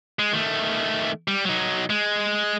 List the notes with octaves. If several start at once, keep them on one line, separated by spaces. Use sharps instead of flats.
G#3
D#3 A3
G3
F#3 D#4
G#3